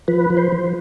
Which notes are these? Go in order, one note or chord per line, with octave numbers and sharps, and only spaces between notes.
F3 B4
F3
C5
F3